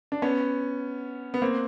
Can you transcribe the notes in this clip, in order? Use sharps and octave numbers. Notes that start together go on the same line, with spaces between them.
D4
B3 C#4
B3
A#3 C4